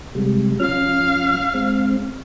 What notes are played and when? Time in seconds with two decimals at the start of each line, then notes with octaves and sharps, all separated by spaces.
0.15 C3 G3 G#3
0.60 F3 C#4 F5 F6
1.54 G#3 C4